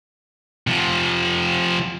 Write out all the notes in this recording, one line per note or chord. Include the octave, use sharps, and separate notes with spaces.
C3 F3